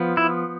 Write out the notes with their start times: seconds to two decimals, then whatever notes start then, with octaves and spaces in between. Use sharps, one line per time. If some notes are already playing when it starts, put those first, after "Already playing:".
Already playing: F3 B3
0.17 E4